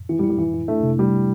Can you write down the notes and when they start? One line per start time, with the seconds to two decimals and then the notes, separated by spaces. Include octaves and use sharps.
0.09 E3 E4
0.19 G3
0.24 E4
0.30 G3
0.38 E3 E4
0.54 E4
0.68 A3 D4
0.83 C3
0.98 G3 A3